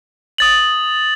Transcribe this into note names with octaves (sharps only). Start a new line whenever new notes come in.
D#6 A6 F#7